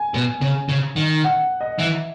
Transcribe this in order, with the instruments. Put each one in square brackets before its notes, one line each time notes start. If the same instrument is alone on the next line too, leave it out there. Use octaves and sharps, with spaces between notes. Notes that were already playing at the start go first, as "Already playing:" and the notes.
Already playing: [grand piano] G#5
[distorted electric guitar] B2
C#3
C#3
D#3
[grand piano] F#5
D#5
[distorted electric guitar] E3 [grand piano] E5